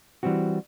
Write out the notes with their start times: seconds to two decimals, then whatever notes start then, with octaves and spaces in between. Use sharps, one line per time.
0.23 E3 G3 C4 F#4